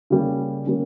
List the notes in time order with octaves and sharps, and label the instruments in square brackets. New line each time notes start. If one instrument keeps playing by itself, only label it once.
[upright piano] C#3 G3 A#3 C#4
C#3 G3 A#3 C#4